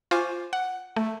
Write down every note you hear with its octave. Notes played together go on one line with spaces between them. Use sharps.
F4 C5 G#5 C#6 D6
F#5
A3